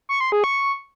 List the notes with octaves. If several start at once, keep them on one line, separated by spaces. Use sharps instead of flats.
C#6
C6
G#4
C#6